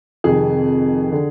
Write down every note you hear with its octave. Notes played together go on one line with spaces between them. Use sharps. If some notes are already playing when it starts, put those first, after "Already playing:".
F2 C3 D#3 G#4
D3